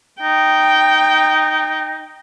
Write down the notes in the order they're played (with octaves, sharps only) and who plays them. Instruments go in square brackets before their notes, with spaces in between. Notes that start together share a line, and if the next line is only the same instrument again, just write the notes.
[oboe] D#4 [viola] G5